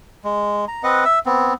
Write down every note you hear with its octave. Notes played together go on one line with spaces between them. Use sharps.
G#3
A#5
C4 B4 D#5 F#5
E5 E6
B3 C4